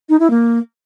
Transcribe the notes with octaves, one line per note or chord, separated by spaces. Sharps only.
D#4
E4
A#3